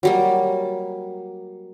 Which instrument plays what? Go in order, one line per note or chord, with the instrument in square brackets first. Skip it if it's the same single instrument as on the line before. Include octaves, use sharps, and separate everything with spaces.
[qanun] F#3 G3 A#3